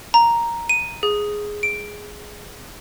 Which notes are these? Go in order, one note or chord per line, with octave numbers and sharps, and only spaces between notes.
A#5
D#7
G#4
D7